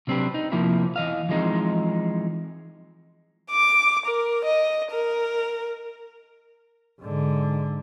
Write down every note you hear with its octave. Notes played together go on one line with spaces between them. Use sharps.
C3 F#3 C4 D4 G4 B4
D#4
C3 F3 A#3 C4 E4
E3 D#5 F5
E3 F3 G#3 C4 D#4
D6
A#4
D#5
A#4
G#2 D3